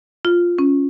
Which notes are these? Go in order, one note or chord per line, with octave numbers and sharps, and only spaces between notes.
F4
C#4